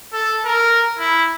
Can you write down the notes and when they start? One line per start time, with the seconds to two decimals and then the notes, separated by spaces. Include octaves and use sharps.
0.13 A4
0.45 A#4
0.99 E4